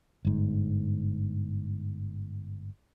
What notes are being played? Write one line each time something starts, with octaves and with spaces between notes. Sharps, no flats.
G1 G#2